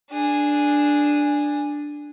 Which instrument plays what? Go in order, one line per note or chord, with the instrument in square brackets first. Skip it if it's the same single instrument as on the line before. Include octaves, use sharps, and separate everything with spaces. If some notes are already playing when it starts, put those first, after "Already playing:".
[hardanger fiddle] D4 G#4